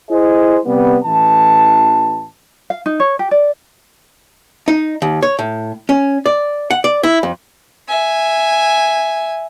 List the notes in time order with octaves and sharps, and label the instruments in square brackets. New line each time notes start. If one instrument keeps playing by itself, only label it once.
[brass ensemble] E4 G#4 C5 D#5
C3 G3 B3
A1 E3 A5
[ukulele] F5
D#4
C#5
G4
D5
[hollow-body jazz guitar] D#4
D#2
C#5
A2
C#4
D5
F#5
D5
E4
F2
[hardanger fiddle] E5 G#5